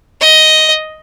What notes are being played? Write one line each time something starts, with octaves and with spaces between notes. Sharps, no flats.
D#5